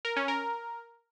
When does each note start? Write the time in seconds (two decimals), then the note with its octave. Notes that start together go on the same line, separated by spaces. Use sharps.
0.05 A#4
0.16 C#4
0.28 A#4